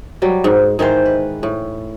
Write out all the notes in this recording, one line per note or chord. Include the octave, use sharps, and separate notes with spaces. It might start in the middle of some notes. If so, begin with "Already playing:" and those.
F#3 G3
G#2
G#2 D#3 E3 C5
B4
A2